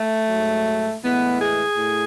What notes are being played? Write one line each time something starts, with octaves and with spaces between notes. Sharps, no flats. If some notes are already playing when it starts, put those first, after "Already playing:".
Already playing: A3
G#2 F#3
A2 E3 G#3 B3
G#4
A2